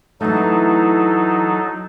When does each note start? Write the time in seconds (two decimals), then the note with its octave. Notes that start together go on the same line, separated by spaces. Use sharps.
0.21 E3 F#3 A3 D#4 A4